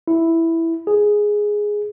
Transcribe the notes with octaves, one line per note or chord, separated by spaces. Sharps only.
E4
G#4